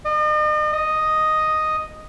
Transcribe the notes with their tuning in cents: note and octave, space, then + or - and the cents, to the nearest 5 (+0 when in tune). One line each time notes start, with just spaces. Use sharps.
D#5 -40
D#5 +0